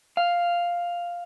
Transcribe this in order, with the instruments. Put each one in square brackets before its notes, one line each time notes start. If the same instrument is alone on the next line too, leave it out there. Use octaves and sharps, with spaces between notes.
[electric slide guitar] F5